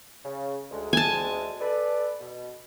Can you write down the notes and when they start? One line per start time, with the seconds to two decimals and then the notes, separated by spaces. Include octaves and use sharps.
0.24 C#3
0.71 D2 G#3
0.93 G#5 A5
1.60 A4 B4 D5
2.20 B2